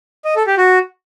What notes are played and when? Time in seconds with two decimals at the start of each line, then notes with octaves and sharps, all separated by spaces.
0.25 D#5
0.36 A4
0.47 G4
0.58 F#4